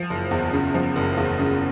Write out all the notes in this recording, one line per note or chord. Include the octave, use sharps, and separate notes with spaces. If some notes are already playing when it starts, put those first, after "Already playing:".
Already playing: F3
F#1
E2
C#3
F3
F#1
E2
C#3